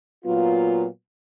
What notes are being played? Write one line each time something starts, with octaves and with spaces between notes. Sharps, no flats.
A#2 F#3 B3 F4